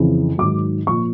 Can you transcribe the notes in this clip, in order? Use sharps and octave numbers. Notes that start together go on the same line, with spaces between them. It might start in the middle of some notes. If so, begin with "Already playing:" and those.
Already playing: F2 C#3 E3
G#2 D#3 F#3 D6
A#2 F3 C#6